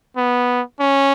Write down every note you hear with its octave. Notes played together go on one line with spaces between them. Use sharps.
B3
C#4